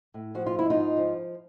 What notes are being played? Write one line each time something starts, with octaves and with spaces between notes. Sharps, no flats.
A2
F3 F#4
F4
G#2 E4
D#4 F4
G#2
F3